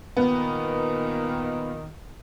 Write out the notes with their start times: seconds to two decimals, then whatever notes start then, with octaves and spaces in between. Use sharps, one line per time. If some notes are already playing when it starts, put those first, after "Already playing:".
0.17 A#2 D#3 B3